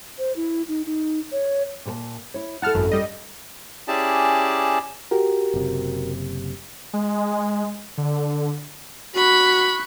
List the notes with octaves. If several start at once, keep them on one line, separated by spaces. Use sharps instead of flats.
C5
E4
D#4
D#4
C#5
A#2 A#4 A5
E4 C#5
E4 A4 F#5 A5 F6
G#1 F#2
G3 D#5
C#4 E4 G4 G#4 D5 A5
F#4 G4 A#4
F#1 C3
G#3
D3
F#4 B5 C#6 F#6